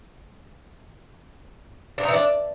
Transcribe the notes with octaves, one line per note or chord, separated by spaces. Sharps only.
D4
D#4
E3
D4